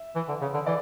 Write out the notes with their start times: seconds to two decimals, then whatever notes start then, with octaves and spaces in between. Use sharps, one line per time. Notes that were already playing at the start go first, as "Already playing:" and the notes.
Already playing: E5
0.16 E3
0.28 D3
0.41 C#3
0.54 D3
0.66 E3 D5